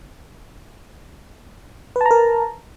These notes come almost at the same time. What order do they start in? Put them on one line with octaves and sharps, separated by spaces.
B4 A5 A#5 A#4